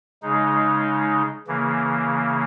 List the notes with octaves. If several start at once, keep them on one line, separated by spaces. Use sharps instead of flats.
C#3 G#3 D#4
C#3 E3 A#3